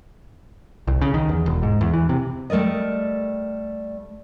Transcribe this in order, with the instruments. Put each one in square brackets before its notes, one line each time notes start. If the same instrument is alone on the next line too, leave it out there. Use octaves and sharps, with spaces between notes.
[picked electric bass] C2
C#3
D#3
E2
E1
G#2
E2
E3
C3
[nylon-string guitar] G3 A3 A#4 D5 D#5